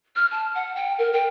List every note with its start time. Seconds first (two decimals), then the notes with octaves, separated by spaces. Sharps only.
0.16 F6
0.31 A5
0.55 F#5
0.76 G5
0.98 A#4
1.13 G5